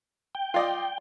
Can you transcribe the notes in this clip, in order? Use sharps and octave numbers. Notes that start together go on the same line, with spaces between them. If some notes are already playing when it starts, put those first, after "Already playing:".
G5
F4 D5 D#5